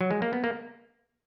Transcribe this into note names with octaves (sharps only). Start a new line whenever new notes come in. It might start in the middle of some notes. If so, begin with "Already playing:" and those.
F#3
G#3
A#3
B3
A#3